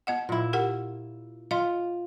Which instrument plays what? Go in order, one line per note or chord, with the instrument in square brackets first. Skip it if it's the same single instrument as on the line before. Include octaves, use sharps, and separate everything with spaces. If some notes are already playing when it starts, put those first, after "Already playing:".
[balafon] B3 D#5 F#5
[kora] A#2 E4
[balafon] G4 A#4 F#5
[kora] F4 [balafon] D#5 C6